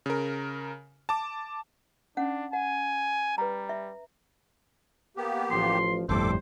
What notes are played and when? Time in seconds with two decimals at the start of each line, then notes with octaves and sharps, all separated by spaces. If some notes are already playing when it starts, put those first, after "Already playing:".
0.06 C#3 A#4
1.09 A5 D6
2.17 C#4 D4 F#5
2.53 F#5 G#5
3.38 G3 B4 A#5
3.69 E5
5.17 A#3 B3 G4
5.51 A1 F3 C6
6.09 G1 F2 A2 G3 A4 C5 D6